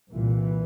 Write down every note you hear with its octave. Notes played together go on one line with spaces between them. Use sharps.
C2 A#2 E3